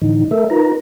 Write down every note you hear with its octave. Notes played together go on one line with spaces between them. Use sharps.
A2 D3 E3 D#4
A3 A4 A#4 E5
D#4 F4 A#4 B4 A#5